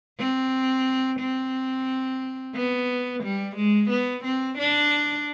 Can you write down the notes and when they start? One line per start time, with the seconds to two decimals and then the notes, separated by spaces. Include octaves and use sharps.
0.19 C4
1.20 C4
2.55 B3
3.23 G3
3.56 G#3
3.90 B3
4.24 C4
4.58 D4